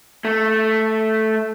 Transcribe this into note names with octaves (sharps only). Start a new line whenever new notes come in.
A3